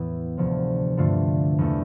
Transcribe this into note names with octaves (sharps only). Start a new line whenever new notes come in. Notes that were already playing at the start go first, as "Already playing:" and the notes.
Already playing: E2 A2 E3 B3 E4
D2 C3 F3
G2 D3 A3 D4 F4
E2 D3 A3